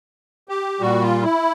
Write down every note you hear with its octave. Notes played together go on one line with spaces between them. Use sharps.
G4
A#2 G3 F#4
F4
E4